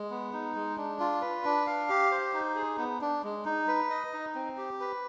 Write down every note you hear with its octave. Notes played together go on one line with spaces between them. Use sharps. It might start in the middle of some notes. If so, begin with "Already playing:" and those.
Already playing: G#3
B3
D#4
G#3
D4
F4
B4
D4
F5
G4
C5
D#4
G#4
B3
D4
G#3
D#4
B4
D#5
D#4
C4
G4
B4